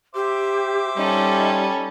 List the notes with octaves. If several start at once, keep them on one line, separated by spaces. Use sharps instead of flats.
G4 C5 E5 D6
G3 C#4 D#4 A4